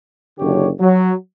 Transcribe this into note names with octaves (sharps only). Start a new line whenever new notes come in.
F#1 F#2 D3 G4 C#5
F#3